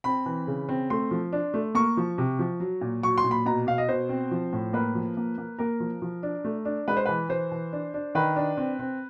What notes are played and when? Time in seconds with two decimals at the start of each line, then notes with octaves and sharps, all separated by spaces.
0.04 C4 B5
0.26 E3
0.47 C#3
0.69 C4
0.90 A3 C6
1.11 F3
1.33 D4
1.54 A3
1.75 A#3 C#6
1.97 F3
2.18 C3
2.39 F3
2.60 F#3
2.81 A#2
3.03 F#3 C#6
3.18 C6
3.24 A#2
3.31 B5
3.46 B2 A#5
3.67 B2 F5
3.78 D#5
3.89 B2 C5
4.09 C4
4.31 F3
4.53 A2
4.73 A#3 B4
4.95 F3
5.17 A#3
5.38 A#3
5.59 A#3 A#4
5.80 F3
6.02 F3
6.23 D4
6.45 A3
6.65 D4
6.88 G#3 B4
6.97 C5
7.06 E3 B4
7.29 E3 C5
7.52 E3
7.73 D4
7.94 D4
8.15 D#3 B4
8.36 D4
8.57 C4
8.79 C4